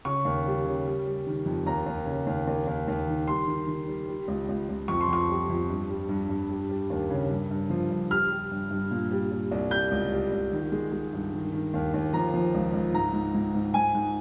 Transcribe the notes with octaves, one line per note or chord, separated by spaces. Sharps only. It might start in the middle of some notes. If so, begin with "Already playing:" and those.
C#3 C#6
D#2
G3
C#3
G3
G3
D#3
F2
D#2 A#5
D#2
C#3
D#2
D#2
D#2
D#2
D#3
G3 C6
D#3
D#3
G3
G3
C#2
C#2
C#2
F2 C#6
C6
F2 C#6
G3
F2
G2
G3
G2
G2
G3
G3
D#2
C#3
G2
G2
F3
G2
G3 F6
G3
G2
G2
A#2
G3
G3
C2
G3 G6
C#2
G3
C#2
D#3
G#3
G#3
G2
D#3
D#3
D#2
D#2
F3 A#5
F3
C#2
C#2
G#2 A#5
G#2
G#2
G#2
G#2 G#5
G#2